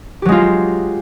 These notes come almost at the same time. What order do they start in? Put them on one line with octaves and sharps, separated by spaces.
G4 F#3 G#3 F4